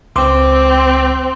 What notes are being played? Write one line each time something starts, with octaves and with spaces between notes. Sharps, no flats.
C#2 C4 C6 D6